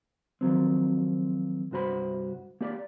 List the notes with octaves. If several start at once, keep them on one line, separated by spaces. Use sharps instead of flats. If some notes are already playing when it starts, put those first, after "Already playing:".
D#3 F3 F#3 C4
C2 G2 F#4 C5 B5
A#3 G4 D5